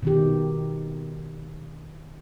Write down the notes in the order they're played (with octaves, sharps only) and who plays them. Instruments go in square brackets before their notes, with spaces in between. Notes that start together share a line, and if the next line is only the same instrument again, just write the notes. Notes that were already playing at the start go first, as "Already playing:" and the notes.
[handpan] B2 D#3 G4